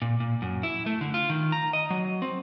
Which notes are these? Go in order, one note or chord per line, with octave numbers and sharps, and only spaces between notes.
A#2
A#2
F#2
E4
A3
D3
F4
D#3
A#5
D#5
F#3
C4